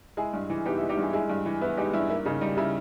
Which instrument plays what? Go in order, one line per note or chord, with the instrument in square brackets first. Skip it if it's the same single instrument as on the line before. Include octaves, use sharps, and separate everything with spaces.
[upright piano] G#3 E4 G#4
G2
E3
B3 D#4 G4
E4
G#3
D#4 G4
G2 E4 G#4
G#3 E4 G#4
G2
E3
B3 E4
G#3 D#4 G4
G2 E4
A#3 E4
C#3 D#4
G3 D#4
C#3 E4